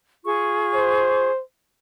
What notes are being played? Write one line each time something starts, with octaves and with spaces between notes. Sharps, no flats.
F4 G#4 C#6
C5